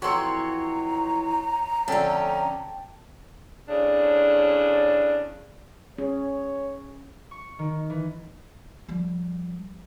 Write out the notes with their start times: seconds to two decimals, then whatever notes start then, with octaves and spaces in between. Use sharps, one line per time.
0.02 F2 E3 F#4 A4 C#5 A#5 C6 C#6
1.88 F2 D3 A3 C#4 G5 A5
3.68 A2 C#3 D4
5.98 C#4 G#4 C#5
7.31 C#6
7.59 D#3
7.90 E3
8.89 F3 G3